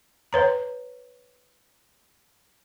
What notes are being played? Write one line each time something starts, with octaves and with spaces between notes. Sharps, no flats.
B4 C#5 A#5